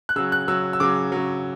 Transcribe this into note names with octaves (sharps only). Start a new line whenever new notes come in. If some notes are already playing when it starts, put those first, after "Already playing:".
F#6
C#3 F#3 E6
F#6
C#3 F#3 E6
E6
C#3 F#3 D6
C#3 F#3